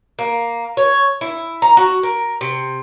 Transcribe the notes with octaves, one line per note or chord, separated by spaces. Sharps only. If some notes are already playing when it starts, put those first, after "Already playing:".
A#3
C#5
E4
A#5
F#4
A#4
C3